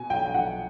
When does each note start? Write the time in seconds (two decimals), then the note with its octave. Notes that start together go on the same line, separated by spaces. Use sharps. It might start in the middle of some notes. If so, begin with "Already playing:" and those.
Already playing: B2 G#5
0.10 B1 G5
0.26 G5
0.34 B1 F#5